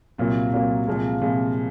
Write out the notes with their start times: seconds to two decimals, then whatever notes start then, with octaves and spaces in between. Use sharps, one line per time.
0.18 C2 A#2 F#3 A#3 F4
0.52 C2 A#2 F#3 A#3 F4
0.88 C2 A#2 F3 G#3
1.22 C2 A#2 F3 G#3